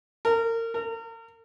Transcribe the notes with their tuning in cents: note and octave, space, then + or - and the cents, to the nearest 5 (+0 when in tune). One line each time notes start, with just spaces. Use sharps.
A#4 -30
A#4 -40